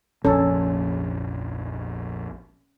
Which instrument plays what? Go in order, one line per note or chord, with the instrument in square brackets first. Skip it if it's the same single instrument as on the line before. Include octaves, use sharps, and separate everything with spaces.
[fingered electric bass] F1 A#1 F3 [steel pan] C#4 A4